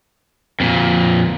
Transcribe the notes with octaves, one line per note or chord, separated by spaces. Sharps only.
F2 A#2